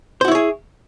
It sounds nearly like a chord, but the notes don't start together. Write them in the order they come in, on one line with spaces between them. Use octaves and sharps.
C5 F#4 E4 C#5 G#4